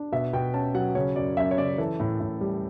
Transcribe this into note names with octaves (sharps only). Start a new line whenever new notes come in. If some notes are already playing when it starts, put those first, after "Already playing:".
Already playing: D4
B2 E5
B2 G5
C#4 A5
F#3 F#5
C#3 C#5
F#2 D5
F#2 E5
C#5
C#3 D5
E3 A4
A2
A2
G3